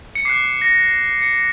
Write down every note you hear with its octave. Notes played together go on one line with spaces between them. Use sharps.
C#7
D6 F#6 C7
A#6
C#7